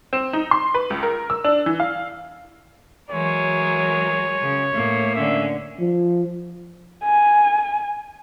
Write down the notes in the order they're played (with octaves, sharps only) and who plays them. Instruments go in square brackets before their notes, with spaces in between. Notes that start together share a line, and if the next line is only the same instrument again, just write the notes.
[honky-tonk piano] C4
D#4
C6
B4
C#2
A#4
E6
D4
E3
F5
[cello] E3 [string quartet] F#3 G#3 A#4 [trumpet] C#5
[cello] C#3
A2 A#3
[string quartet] D3 C#4 [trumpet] E5
[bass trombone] F3
[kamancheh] G#5